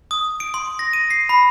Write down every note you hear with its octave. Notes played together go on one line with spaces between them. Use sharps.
D#6
D7
C6
A#6
D#7
C7
B5